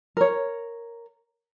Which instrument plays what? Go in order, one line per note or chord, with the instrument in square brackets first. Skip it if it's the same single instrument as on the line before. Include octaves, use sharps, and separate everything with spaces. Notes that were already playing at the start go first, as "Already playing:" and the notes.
[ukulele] A#4 C#5